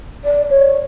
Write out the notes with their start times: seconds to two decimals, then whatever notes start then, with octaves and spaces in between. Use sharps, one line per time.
0.25 D5
0.50 C#5